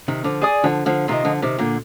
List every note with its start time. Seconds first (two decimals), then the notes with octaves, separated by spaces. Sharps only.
0.08 C3 D#3
0.24 D3 F3
0.41 G#4 D5 G#5 D#6
0.64 D3 F3
0.86 D3 F3
1.08 C3 D#3 F4 A#4 D#5
1.25 D3 F3
1.42 C3 D#3
1.59 A#2 D3